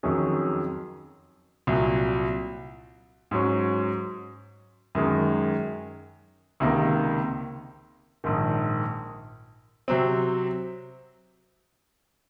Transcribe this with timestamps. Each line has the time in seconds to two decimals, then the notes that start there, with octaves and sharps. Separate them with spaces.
0.03 F2 D#3 F#3 C#4 G#4
1.67 C2 A#2 F#3
3.31 G#2 F#3 C#4
4.95 F#2 D#3 G#3
6.60 C#2 C3 D#3 A#3
8.24 A#1 G#2 D#3
9.88 C3 F#3 C4